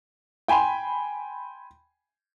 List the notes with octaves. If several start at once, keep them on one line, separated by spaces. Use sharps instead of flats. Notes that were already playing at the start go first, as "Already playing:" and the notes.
G5 G#5 B5 C6